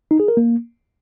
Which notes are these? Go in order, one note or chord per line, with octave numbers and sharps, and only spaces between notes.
D#4
G#4
A#4
A#3